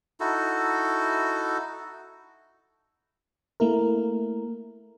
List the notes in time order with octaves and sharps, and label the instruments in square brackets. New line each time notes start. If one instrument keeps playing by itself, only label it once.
[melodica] D#4 E4 F#4 A4
[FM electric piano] A3 A#3 E4 A#4